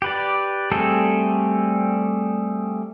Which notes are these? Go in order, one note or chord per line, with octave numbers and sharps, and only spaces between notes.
G4 B4 D5
G3 A3 C4 G#4 A4